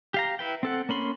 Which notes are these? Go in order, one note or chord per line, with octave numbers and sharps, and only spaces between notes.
G4 F5 A#5
E4 B4 G5
C4 A4 F#5
A#3 C#4 B5 C6